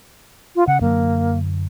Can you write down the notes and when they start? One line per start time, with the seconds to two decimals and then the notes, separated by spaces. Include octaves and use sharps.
0.56 F4
0.67 C#3 F#5
0.81 F#2 D3 F#3 A#3